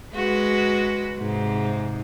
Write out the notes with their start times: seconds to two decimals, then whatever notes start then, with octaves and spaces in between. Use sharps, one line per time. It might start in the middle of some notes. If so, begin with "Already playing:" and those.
0.14 G#3 F#4 B4
1.18 G#2 C3